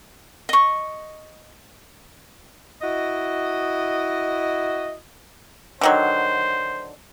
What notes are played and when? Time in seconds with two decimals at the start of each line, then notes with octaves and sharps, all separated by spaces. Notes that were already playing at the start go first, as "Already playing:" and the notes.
0.49 D#5 C#6
2.82 E4 F#4 D#5
5.81 D3 D#3 F#3 C5